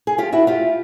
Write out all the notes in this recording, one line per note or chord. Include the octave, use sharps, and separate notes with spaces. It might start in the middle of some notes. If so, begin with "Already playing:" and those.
G#4
F4 G4
E4 F#4
F4 G4